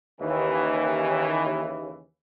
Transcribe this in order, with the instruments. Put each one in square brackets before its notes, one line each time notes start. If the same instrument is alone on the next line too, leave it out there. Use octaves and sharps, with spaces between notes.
[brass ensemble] D#2 C#3 E3